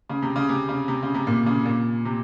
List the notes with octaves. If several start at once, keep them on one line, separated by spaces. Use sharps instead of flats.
C#3
C3
C#3
C3
C#3
C3
C#3
C3
A#2
C#3
A#2
C3